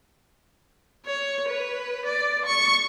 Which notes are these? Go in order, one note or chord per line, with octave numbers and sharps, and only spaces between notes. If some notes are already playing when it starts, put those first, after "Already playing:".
C#5
B4
D5
C#6